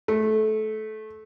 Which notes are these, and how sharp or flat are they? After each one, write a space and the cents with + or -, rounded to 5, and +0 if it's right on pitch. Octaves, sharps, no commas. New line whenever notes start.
A3 -20